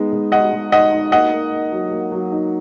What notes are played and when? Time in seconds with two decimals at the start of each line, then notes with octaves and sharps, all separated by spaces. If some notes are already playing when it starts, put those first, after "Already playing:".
Already playing: G#3 B3 D#4
0.13 G#3
0.32 D#4 D#5 F#5
0.53 G#3
0.72 D#4 D#5 F#5
0.92 D#4
1.11 A#3 D#5 F#5
1.32 A#3
1.52 A#3
1.72 F#3
1.91 A#3
2.12 F#3
2.32 D#4